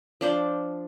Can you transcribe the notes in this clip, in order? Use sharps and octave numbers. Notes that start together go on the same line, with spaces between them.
F3 D4 C5 D5